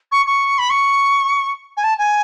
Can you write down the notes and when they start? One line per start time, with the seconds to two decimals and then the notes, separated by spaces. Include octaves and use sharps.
0.12 C#6
0.27 C#6
0.58 B5
0.70 C#6
1.77 G#5
1.84 A5
1.98 G#5